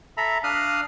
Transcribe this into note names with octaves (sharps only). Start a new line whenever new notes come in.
A4 E5 A#5 B5
D4 F5 D#6 F6 F#6